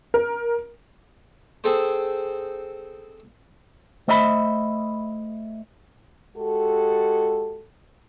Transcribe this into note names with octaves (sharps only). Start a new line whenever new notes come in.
A#4
C4 G#4 A4 C5
A3 C5 D#5 E5 A5 B5
G#3 F#4 G4 A4